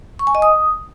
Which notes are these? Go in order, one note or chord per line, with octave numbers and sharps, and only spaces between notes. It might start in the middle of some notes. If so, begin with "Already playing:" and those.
C#6
G#5
D#5
D#6